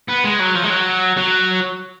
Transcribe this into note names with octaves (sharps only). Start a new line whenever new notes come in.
B3
G#3
F#3
F3
G#3
F#3
F#3